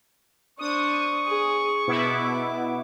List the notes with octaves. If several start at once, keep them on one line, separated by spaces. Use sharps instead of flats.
D4 C5 C#6 D#6
G#4
B2 B3 E4 D6